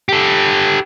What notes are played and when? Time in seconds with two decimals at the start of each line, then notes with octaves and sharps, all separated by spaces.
0.09 G4 A4